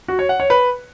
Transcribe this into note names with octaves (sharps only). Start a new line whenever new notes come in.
F#4
C#5
F#5
C#5
B4